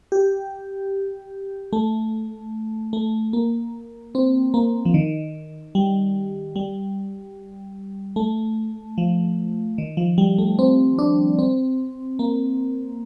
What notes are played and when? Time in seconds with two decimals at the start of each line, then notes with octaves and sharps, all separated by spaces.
0.12 G4
1.73 A3
2.93 A3
3.33 A#3
4.15 C4
4.54 A#3
4.85 F3
4.94 D#3
5.75 G3
6.56 G3
8.16 A3
8.98 F3
9.78 D#3
9.97 F3
10.18 G3
10.38 A3
10.59 C4
10.99 D4
11.39 C4
12.19 A#3